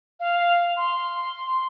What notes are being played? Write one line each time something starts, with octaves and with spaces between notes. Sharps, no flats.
F5
C6